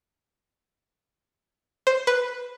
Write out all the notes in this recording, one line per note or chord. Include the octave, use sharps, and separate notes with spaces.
C5
B4